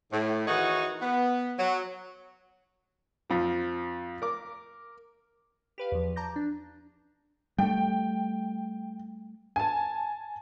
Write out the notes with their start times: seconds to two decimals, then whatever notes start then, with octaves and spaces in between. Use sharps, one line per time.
0.13 A2
0.48 D#3 E3 D#4 F#4 G#4 C#5
1.02 B3
1.59 F#3
3.30 F2 F3
4.22 A#4 D6
5.78 G4 B4 F5
5.92 E2 F3
6.16 A5 A#5 D6 G6 A#6
6.36 D4
7.59 G3 A3 G5
9.56 G#5 A5